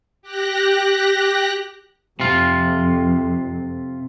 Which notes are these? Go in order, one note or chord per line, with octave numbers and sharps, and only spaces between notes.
G4 F#6 A#6
F2 C3 F4